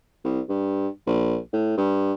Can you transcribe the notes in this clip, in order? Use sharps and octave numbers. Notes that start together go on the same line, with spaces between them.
C2
G2
A#1
A2
G2